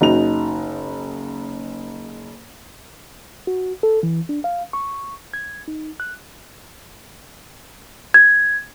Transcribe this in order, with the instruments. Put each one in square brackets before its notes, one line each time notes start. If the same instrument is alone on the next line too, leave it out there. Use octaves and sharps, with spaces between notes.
[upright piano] F#1 D#4 F#4 F7
[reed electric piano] F#4
A4
E3
D4
F5
C#6
G#6
D#4
F#6
[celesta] G#6